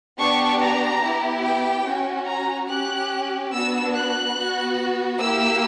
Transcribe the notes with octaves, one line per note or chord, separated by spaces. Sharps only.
B3 D4 G4 C#6
A#5
B3 E4 G4
G5
C#4 F#4
A#5
C#4 G4 F#6
B3 D4 F#4 E6
F#6
B3 F#4
A#3 E4 G4 E6